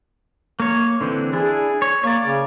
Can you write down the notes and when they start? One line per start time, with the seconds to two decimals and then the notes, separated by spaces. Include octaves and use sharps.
0.60 A#3 C#5
1.01 D3 E3 C4
1.33 D4 E4 G#4
1.82 C#5
2.04 A#3 C#5 D5
2.24 C#3